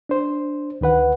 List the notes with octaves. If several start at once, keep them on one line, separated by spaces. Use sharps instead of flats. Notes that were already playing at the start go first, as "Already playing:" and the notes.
D4 C5
D2 D#3 B4 F#5